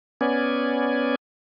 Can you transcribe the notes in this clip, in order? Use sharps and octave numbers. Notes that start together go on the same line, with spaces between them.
B3 C#4 D5 G#5